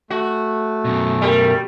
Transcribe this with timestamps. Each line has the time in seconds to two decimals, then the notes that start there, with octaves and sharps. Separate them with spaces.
0.10 A3 F#4
0.85 F#2 B2
1.22 G3 A#4